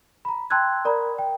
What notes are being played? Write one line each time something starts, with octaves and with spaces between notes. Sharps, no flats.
A#5 B5
G5 A5 C6 E6 F#6 G#6
A#4 D5 A#5 B5
G5